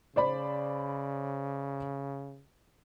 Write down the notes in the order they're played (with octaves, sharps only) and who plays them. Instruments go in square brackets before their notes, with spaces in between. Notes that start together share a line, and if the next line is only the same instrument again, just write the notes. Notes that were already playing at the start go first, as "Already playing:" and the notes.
[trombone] C#3 [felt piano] C5 D5 B5